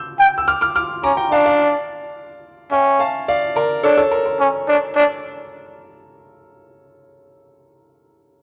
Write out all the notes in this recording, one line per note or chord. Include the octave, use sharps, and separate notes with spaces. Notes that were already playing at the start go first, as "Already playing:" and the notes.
Already playing: D6 E6 G6
G5
E6
D6 F6
D6 F6
D6 F6
C#4 A#5 D6
G5 A#5
D4 F5 A5
D5 F5
C#4 E5 G5
F5 A5
D5 F5
A#4 D5
D4 A4 C#5
A4 C#5
A#4
A#4
C#4
D4
D4